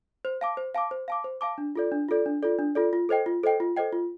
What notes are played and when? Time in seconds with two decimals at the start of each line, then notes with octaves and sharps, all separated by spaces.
0.25 C5
0.41 F5 A5 D6
0.57 C5
0.74 F5 A5 D6
0.91 C5
1.08 F5 A5 D6
1.24 C5
1.41 F5 A5 D6
1.58 D4
1.76 F4 A4 D5
1.92 D4
2.08 F4 A4 D5
2.26 D4
2.43 F4 A4 D5
2.59 D4
2.75 F4 A4 D5
2.93 F4
3.09 A4 C5 D#5 G5
3.26 F4
3.43 A4 C5 D#5 G5
3.60 F4
3.77 A4 C5 D#5 G5
3.93 F4